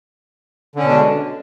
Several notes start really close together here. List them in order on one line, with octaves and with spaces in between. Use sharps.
D3 C#4 B2 D4 G#3